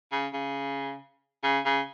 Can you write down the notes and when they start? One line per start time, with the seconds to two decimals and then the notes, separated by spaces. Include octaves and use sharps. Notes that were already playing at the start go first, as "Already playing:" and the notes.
0.12 C#3
0.34 C#3
1.44 C#3
1.66 C#3